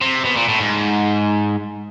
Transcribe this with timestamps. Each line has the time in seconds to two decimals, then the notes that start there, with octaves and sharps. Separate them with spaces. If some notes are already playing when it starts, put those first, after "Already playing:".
0.01 C3
0.25 B2
0.37 A#2
0.49 A2
0.60 G#2